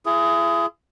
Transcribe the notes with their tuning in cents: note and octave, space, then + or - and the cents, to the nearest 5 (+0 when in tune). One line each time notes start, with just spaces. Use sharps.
E4 +40 G#4 +10